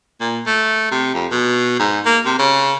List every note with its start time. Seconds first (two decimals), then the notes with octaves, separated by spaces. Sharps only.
0.21 A#2
0.46 A3
0.91 C3
1.14 F2
1.31 B2
1.79 G#2
2.05 A#3
2.25 C3
2.39 C#3